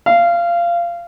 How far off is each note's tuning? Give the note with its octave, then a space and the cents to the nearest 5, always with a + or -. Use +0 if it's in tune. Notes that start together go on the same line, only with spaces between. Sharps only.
F5 -20